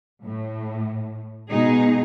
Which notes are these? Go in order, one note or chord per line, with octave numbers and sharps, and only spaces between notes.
A2
B2 G#3 D#4 G#4